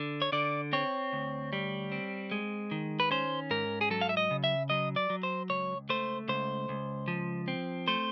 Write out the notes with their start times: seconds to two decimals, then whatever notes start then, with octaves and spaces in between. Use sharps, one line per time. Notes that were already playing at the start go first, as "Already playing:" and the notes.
Already playing: D3
0.22 C#5
0.32 D3 D5
0.73 C4 C#5
1.13 D2
1.53 G3
1.92 C4
2.32 G#3
2.71 D#3
3.00 B4
3.11 C#4 C5
3.51 G#2 A#4
3.81 G#4
3.90 F#3 A4
4.01 F5
4.09 E5
4.17 D#5
4.31 C#3
4.44 E5
4.70 F#3 D#5
4.96 D5
5.10 F#3
5.23 C5
5.50 C#2 C#5
5.89 A3 C5
6.28 C#2 C5
6.69 C#2
7.08 F3
7.48 C4
7.88 A3 C5